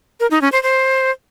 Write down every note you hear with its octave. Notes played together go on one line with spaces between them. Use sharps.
A#4
D#4
C#4
C5
C5